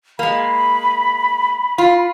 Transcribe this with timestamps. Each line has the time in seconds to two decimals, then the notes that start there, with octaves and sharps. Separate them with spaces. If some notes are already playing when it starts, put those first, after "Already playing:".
0.19 G#3 A#3 B5
1.78 F4